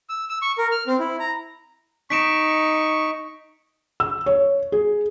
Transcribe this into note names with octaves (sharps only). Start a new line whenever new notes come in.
E6
E6
C#6
A#4
F6
C4
E4
A#5
D#4 C#6 B6 D7 E7
E6
C#5
G#4